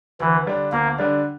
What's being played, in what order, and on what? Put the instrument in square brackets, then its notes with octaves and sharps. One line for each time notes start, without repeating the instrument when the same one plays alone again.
[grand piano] D2 [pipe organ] E3
[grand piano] D3 G3 D4
[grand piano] D2 [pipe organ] A#3
[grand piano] D3 G3 D4